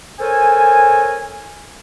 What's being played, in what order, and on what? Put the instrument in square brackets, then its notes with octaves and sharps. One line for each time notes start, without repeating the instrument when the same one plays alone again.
[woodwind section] A4 A#4 C5 C#5 G#5